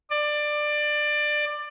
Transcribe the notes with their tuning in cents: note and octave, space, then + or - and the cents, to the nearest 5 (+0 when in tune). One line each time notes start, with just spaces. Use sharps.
D5 +20